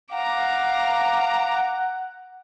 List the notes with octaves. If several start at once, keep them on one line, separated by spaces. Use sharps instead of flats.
F5 F#5 A#5 D6